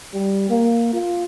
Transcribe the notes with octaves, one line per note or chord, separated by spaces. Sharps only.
G3
A#3
F4